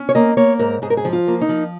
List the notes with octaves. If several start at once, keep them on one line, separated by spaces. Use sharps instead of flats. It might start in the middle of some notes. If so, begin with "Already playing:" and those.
Already playing: C#4
C#5
A#3 D#5
A#3 C#5
G#2 A#4
G#2 G#4
A#4
G#4
F3
F4
A#3
D#4
F3